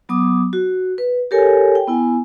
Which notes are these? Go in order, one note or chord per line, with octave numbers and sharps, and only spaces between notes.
F#3 B3 D6 D#6
F#4
B4
G4 A4 A#4 C#5 G#5
G5
B3 E4 G#5